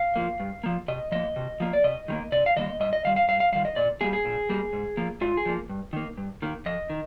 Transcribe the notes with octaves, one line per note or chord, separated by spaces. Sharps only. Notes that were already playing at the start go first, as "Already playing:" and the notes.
Already playing: F5
F3 A#3
G2
F3 A#3
C3 D#5
F3 A#3 D#5
C3
F3 A#3
D5
C3 D#5
D#3 G3 A#3
C3 D5
F5
D#3 G3 A#3 D#5
G2 D#5
D#5
D#3 G3 F5
F5
G2 F5
F5
D#3 G3 F5
D#5
A#2 D5
G3 A#3 G#4
G#4
A#2
G3 A#3
G#2
F3 A#3
G#2 F4
G#4
F3 A#3
G2
D#3 A#3
G2
D#3 A#3
F2 D#5
D#3